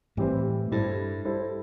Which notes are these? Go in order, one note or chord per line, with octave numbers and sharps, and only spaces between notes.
A2 E3 G3 C4 G4 C5
G2 G3 E4 A4 C5
G3 E4 A4 C5